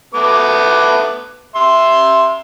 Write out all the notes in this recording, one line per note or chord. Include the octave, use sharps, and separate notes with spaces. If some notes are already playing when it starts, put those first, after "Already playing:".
A3 B3 D6
E5 C6